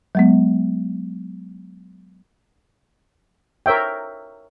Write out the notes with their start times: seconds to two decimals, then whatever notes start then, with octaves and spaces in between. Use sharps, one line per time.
0.15 F#3 G#3 B3
3.66 A#4 C#5 E5 G5